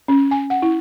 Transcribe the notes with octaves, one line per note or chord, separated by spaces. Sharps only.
C#4
G#5
F#5
E4